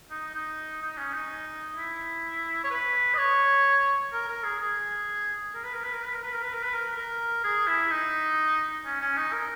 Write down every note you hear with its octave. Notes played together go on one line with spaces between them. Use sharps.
D#4
D#4
D#4
C#4
D#4
E4
C#5
B4
D#5
C#5
A#4
A#4
G#4
G#4
A#4
B4
A#4
B4
A#4
B4
A#4
B4
A#4
B4
A#4
B4
A#4
A#4
G#4
E4
D#4
C#4
C#4
D#4
A#4